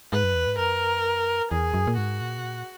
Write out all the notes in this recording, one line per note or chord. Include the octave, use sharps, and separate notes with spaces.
G#2 B4
F#2
E2
G#2
F#2 A#4
E2 G#4
F#2
A#2
G#2 F#4
A#2
B2
A#2